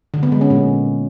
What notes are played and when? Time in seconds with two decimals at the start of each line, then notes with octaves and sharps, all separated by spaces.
0.14 D3
0.23 B3
0.32 G#3
0.41 C#4
0.50 A#2